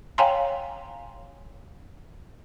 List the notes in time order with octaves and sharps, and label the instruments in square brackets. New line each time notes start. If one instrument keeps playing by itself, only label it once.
[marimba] C#5 F5 G5 G#5 A#5 C6